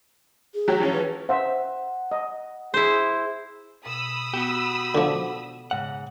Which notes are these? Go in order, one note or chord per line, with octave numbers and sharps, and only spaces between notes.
G#4
F#3 F#4 G4
E3 F3 C#4
B4
C5 E5 F#5
D#5
E4 G#4 C5
B2 B5 D#6 E6
B3 F#4 G4
D3 F3 F#5 A5 D6
G#2 C#3 F#5